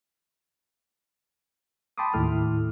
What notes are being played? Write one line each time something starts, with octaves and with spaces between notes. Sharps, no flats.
G5 A5 B5 C6 D6 D#6
D#2 A2 E4 A4 F6